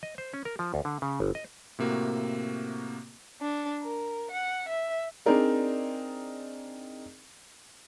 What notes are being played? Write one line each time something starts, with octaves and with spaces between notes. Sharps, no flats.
D#5
C5
C#4
A#4
F3
D2
D3
C#3
G1
D#5
A2 C3 A#3 F#4
D4
A#4
F#5
E5
C4 D4 D#4 G#4 A#4 D5